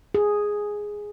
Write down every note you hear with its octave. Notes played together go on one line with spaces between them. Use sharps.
G#4